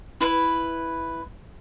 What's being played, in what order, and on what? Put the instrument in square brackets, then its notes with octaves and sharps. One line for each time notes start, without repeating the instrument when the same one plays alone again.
[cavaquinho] E4 B4 B5